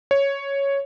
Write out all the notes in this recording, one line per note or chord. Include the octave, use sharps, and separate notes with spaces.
C#5